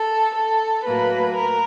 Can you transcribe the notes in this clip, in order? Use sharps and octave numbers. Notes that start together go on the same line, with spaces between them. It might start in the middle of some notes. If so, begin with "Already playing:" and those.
Already playing: A4
A4
A2 F#3 A#3 B4
A#4